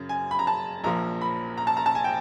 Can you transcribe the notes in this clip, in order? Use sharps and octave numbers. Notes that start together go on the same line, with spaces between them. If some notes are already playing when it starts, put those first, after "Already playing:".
Already playing: F#2 C#3
G#5
B5
A#5
A5
A#1 A#2 F3 A#5
B5
A#5
A5
A#5
A5
G#5
G5